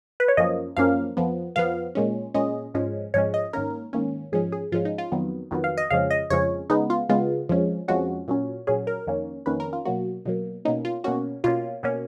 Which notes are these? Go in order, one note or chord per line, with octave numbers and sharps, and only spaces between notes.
B4
C#5
F#2 F3 A#3 C#4 D#5
F#2 F3 A#3 C#4 F5
F2 F3 B3
F2 F3 B3 F5
A#2 G#3 C#4
A#2 G#3 C#4 D#5
G#2 F3 G#3 C#4
G#2 F3 G#3 C#4 C#5
D#5
G#2 D#3 A#3 C#4 A#4
G#2 D#3 A#3 C#4
G#2 F3 G#3 C#4 G#4
G#4
G#2 F3 G#3 C#4 F4
D#4
F4
F2 D#3 F#3 B3
F2 D#3 F#3 B3
F5
D#5
F2 C#3 F3 G#3 C#4 F5
D#5
F2 C#3 F3 G#3 C#4 C#5
C#3 G#3 B3 D#4
F4
C#3 G#3 B3 F4
F2 F3 G#3 C#4
F2 F3 G#3 C#4 F#4
A#2 F#3 C#4
A#2 F#3 C#4 G#4
A#4
F2 D#3 A#3 C#4
F2 D#3 A#3 C#4 B4
A#4
F4
B2 F#3 A#3 F#4
B2 F#3 A#3
B2 A#3 C#4 D#4
F4
B2 A#3 C#4 F#4
B2 A#3 C#4 F4
B2 A#3 C#4